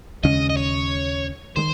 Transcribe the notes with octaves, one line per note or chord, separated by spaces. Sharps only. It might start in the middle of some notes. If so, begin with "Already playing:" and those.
D#2 C#3 G#3 C#4 D#5
D#5
C#5
D#3 G#3 C5